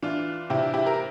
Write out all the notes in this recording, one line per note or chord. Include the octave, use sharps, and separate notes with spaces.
E3 D4 F4
C3 E4 G4
E4 G4
A#4